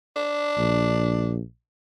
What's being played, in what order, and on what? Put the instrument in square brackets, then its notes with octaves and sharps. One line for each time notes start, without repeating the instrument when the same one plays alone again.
[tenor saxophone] D4
[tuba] A#1